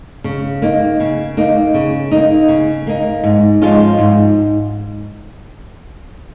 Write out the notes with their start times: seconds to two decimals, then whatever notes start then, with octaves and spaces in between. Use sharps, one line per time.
0.24 C#3
0.62 A#3 D#4
1.00 C#3
1.37 A#3 D#4
1.74 C#3
2.11 A#3 D#4
2.48 C#3
2.87 A#3 D#4
3.24 G#2
3.61 F3 G#3 C#4 F4
3.99 G#2